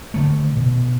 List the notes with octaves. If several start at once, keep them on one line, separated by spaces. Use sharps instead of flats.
D3 D#3 A3
B2